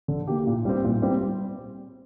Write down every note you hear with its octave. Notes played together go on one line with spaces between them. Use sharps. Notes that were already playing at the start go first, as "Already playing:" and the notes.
D3
A#3 G4
A#2
G3 C4
A#2
G3 C4